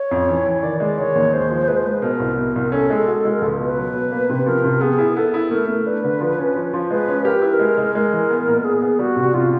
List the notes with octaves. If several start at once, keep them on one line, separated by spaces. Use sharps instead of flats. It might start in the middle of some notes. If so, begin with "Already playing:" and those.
Already playing: C#5
F2
E3
E3
D#3 D5
G#3 D5
D#3 C#5
D#2
G#3 C5
F3
G#3 B4
C5
G#3 B4
B2 A#4
C2
B2
C2
C#4 A4
G#3
F#4
G#3
A#4
C#2 A4
B2
B4
F#3
B2
A#3
C3
F3 A#4
C3
B3 G#4
E4
B3 A4
E4
A3 A#4
A3
D4 B4
D3
F3
C#4
F3
F3
G#3 B4
C#4
G4 A#4
E4 B4
A#4
G#3
G#3
G#3 A#4
E3
B3
A#2
B3 G#4
B3
G3 F#4
C3
C3 F4